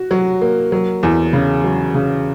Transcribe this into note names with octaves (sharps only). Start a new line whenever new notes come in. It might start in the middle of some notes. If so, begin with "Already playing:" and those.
Already playing: F#4
F#3
A#3
F#3
E2
C#3
F#3
C#3